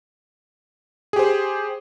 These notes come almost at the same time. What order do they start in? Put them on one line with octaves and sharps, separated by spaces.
G#4 G4 C5